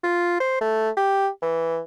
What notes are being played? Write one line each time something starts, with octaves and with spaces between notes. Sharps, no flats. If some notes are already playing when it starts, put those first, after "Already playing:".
F4
C5
A3
G4
E3